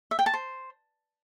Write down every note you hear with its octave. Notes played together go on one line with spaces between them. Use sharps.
E5
G5
A5
C5